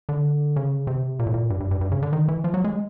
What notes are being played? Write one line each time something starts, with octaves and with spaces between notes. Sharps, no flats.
D3
C#3
C3
A#2
A2
A#2
G2
G2
G2
G2
C#3
D3
D#3
E3
F3
F#3
G#3